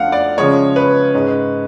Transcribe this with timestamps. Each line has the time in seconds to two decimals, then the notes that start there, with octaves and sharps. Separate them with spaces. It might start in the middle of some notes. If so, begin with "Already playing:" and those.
Already playing: F2 F3 A3 D4 F5 F#5
0.12 D5
0.38 C#3 F3 G#3 C#4 C#5
0.76 B4
1.14 G#2 G#3 C#4